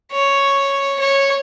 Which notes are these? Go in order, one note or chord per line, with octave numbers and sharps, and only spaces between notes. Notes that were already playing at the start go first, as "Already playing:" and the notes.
C#5
C#5